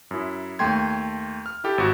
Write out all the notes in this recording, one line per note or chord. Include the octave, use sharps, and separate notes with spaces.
F#2 E4
D#2 A3 G5 C6 G#6
F6
E4 G4 A4
G#1 F#4